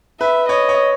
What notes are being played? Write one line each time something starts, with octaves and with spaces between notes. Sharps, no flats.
B4 E5
C#5 D#5
C#5